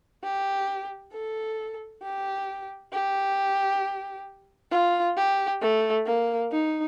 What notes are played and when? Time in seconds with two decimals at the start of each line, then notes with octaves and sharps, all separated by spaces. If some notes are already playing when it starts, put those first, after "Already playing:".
0.23 G4
1.13 A4
2.03 G4
2.93 G4
4.71 F4
5.17 G4
5.61 A3
6.06 A#3
6.52 D#4